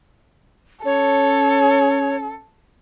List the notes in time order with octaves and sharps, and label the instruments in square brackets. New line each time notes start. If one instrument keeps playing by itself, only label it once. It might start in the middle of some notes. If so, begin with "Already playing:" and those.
[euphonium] C#4 [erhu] A4 [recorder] C#5